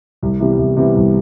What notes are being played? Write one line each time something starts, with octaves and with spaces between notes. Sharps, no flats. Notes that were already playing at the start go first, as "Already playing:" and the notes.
C2
C3 E3 G3 B3
C2
C3 E3 G3 B3
C2